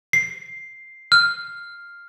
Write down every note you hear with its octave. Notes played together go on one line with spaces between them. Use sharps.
C7
F6